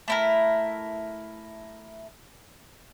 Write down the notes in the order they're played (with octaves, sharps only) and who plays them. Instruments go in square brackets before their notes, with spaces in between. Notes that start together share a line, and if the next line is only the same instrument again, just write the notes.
[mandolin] A3 E4 A#4